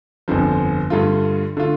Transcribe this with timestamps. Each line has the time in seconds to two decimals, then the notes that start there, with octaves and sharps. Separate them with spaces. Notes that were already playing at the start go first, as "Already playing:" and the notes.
0.28 G1 F2 D3 F3
0.90 G2 D3 A3 F4
1.57 D3 A3 F4